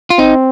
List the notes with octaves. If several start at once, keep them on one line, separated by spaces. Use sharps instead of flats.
F4
C4 D#4